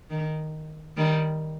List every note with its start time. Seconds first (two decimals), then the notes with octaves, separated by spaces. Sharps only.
0.10 D#3
0.97 D#3 G3